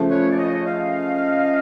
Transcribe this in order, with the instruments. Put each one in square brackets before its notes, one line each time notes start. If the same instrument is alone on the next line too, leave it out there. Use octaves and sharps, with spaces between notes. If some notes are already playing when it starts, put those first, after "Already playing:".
Already playing: [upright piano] C#3 F3 A3
[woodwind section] B4 C#5
D5
C#5 D#5
D#5 F5